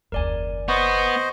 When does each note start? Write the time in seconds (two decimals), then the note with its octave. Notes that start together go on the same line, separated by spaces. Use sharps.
0.12 F#1 D#2 A#4 D5 G#5
0.68 B3 C5 D#5 C#6